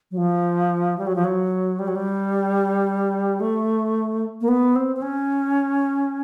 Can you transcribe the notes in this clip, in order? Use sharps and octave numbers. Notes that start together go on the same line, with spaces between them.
F#3
F3
G3
F#3
F3
F#3
G3
F#3
G3
A3
A#3
B3
C4
C4
C#4